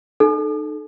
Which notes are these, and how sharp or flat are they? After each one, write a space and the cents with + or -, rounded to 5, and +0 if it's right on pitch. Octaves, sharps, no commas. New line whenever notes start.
D#4 -30 A4 -20